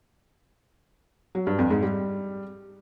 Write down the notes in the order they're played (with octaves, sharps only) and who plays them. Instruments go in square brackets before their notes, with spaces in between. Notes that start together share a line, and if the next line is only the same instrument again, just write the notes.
[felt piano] F#3
G2
F2
G#2
G3